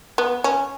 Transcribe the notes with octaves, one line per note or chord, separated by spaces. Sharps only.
B3
C#4